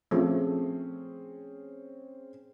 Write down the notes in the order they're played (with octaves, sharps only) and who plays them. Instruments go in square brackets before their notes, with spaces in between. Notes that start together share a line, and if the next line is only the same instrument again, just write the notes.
[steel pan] F3 A3 [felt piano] C4 C#4 G#4